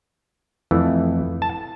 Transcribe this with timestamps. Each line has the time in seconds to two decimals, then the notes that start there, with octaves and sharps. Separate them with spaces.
0.71 F2 E3 A3
1.42 A5